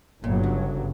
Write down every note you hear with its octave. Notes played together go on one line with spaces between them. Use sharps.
G1 G2 A#2 F#3
C#3